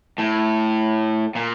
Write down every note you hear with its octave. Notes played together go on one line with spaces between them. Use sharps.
A2
A#2